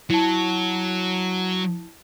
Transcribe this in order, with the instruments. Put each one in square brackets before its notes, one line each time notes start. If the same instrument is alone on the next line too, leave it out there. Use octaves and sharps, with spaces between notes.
[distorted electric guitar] F#3 [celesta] E4 A5